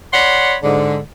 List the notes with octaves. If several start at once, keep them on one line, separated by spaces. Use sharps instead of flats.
C#5 D5 F#5 B5 C6
G#2 D3